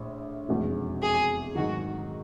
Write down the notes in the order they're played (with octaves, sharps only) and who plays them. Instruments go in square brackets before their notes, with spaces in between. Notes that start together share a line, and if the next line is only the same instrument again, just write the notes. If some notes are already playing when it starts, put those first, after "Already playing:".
Already playing: [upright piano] A#1 A2
F1 E2 B2 G#3
[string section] G#4
[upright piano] G#2 D#3 F#3 [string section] F#4